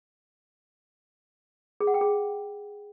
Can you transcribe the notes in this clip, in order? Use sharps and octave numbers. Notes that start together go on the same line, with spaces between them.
G#4
F#5
G5
G#4